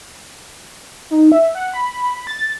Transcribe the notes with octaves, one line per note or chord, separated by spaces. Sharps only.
D#4
E5
F#5
B5
A6